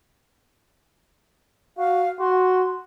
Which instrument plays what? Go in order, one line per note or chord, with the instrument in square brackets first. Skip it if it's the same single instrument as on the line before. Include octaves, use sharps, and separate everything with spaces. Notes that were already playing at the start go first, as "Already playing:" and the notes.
[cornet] F#4 [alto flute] F5
[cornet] F#4 [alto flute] C6